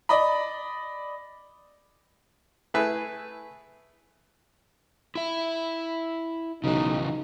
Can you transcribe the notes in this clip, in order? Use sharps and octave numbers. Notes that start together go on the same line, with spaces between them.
D5 D#5 B5
A3 E4 G#4 B4
E4 E5
B1 C#3 E3 D#4